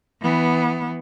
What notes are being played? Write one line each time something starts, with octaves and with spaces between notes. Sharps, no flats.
E3 B3